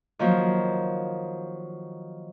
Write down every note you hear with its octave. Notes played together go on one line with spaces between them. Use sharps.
D#3 F3 F#3 A#3